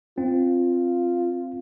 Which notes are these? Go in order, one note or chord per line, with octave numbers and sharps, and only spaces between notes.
C4 F4